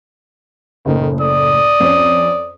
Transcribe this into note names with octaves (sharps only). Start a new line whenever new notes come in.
F#1 A2 D#3
D5 D#6
F2 C#4